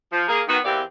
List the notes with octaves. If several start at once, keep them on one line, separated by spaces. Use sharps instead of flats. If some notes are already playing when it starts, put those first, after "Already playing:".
F3
A#3 G#4
D#3 B3 F#4
E2 E3 A#3 C4 G4 D5